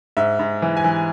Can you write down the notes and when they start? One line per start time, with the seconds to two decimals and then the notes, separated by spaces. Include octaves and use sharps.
0.17 G#2 E5
0.39 G#2
0.62 E3
0.77 G#5
0.84 E3